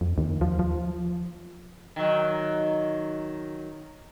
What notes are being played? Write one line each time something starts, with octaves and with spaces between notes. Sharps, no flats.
F2
D#2
F3
F3
D#3 F#3